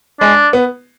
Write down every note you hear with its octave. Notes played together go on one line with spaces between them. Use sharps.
G#3 D4
B3